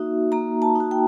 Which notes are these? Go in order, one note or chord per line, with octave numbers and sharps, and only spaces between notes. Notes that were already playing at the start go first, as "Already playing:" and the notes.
Already playing: A#3 D#4 F#4 E5
A#3 A#5
A5
D#4 F#4
G5